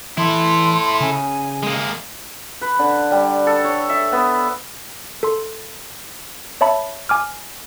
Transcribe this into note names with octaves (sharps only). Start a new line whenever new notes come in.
E3 E4 A4 C6
C#3 G#5
G#3 A#3
B4
D3
G3
A4
C#5
E5
B3
A4 C6
C#5 E5 A5 B5
G#5 D6 F6